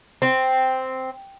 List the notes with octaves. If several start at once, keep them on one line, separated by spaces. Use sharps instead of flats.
C4